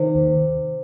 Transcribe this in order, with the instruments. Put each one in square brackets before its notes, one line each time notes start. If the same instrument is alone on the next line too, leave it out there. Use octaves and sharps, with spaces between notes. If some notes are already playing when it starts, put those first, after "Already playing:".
Already playing: [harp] C3 [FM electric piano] D#3
[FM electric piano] D#2